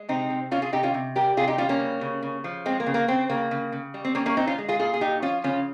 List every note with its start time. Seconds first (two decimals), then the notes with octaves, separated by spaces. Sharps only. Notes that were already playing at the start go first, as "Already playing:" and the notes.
Already playing: G#3
0.09 C3 C4 D#4
0.30 C3
0.51 C3 C#4 F4
0.62 F4 G#4
0.73 C3 D#4 G4
0.83 C#4 F4
0.94 C3
1.16 G3 G4 A#4
1.37 C3 F4 G#4
1.48 D#4 G4
1.58 G3 C#4 F4
1.69 A#3 C#4
1.80 C#3
2.01 C#3
2.23 C#3
2.44 F3
2.66 G#3 C4
2.80 A#3
2.86 C#3
2.94 A#3
3.08 C#3 C4
3.29 C#3 A#3
3.51 C#3
3.72 C#3
3.94 G3
4.05 C4
4.15 G3 A#3 C#4
4.26 A#3 C#4
4.37 A#2 C4 D#4
4.47 C#4 F4
4.58 G#3
4.68 F4 G#4
4.79 A#2 F4 G#4
4.94 G#4
5.01 A#2 D#4 G4
5.22 F3 C#4 F4
5.44 C#3 C#4 F4